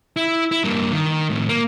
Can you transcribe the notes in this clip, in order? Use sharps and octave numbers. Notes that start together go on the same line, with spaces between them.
E4
E4
G2 A#3
D#3
A2 D#3
A#3